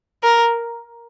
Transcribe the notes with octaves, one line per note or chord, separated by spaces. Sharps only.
A#4